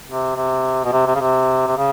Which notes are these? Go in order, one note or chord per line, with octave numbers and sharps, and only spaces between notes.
C3
C3
B2
C3
C3
C#3
C3
C3
C#3